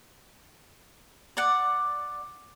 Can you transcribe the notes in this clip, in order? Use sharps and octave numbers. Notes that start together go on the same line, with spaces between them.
D5 F#5